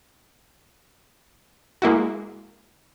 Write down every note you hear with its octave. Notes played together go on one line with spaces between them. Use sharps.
G#3 A#3 E4 F#4